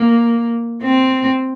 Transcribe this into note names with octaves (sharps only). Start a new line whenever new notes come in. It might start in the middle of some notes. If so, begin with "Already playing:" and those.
Already playing: A#3
C4